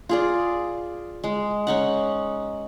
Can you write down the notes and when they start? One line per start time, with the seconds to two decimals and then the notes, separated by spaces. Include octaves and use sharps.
0.09 F4 G#4 D5
1.24 G#3
1.67 C#4 D#4 F#5